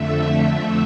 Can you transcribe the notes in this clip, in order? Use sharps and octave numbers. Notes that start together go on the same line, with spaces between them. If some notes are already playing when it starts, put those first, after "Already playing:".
Already playing: F2 D3 A3 E5
E5